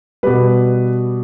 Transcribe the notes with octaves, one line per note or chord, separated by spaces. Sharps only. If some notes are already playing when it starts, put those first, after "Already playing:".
B2 G3 B4